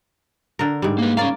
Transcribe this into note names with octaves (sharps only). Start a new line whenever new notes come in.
D3 A#4
G#2 G3
A#3 B4
A#3 C#4 D5 F5